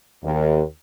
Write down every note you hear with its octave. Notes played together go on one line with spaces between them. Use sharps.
D#2